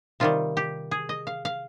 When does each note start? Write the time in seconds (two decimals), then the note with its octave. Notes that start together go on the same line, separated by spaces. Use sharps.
0.20 C3 D#3 G3 F4
0.57 G4
0.91 G#4
1.09 D#5
1.27 F5
1.45 F5